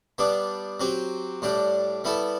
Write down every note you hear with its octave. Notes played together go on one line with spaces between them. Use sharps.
G3 B3 D4 G4
F#3 C4 G4
A2 G3 D4 G4
G3 B3 E4 A4